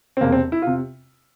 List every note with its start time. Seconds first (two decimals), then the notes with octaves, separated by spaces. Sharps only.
0.17 C4
0.21 E1 E2 C3 A#3
0.32 C4
0.52 E4
0.62 C3 F4